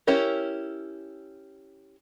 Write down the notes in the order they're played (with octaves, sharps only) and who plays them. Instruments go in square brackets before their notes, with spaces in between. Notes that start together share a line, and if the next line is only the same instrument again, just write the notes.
[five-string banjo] C#4 E4 G4 A#4